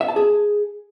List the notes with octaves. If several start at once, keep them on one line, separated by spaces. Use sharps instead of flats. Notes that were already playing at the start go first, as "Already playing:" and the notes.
E5
A5
G#4